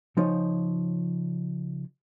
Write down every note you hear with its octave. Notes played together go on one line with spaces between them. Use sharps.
C#3 F3 D#4 C#5